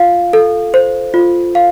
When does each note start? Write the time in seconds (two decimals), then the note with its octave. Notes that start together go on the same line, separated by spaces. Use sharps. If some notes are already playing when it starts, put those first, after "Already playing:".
Already playing: F4 F5
0.33 A4
0.74 C5
1.14 F4
1.55 F5